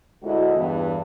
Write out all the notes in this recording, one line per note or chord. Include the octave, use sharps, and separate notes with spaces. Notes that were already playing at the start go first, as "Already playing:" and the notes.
D2 G#3 E4 F#4 A4 D#5
E2 G2